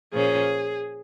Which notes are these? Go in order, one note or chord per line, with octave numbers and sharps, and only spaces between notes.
A#2 F3 C#4 G#4